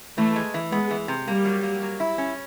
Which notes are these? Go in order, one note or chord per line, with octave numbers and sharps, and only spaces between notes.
E3 A3
G#3
E3
G#3 B3
E3
C3
G3 A#3
F#3
A#3
F#3
E4
C#4